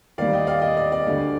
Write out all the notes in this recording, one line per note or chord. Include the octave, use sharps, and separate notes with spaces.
D#2 D#3 G3 D5 F5
D#5 G5
D5 F5
D#5
D5
D5
D2 D3 G3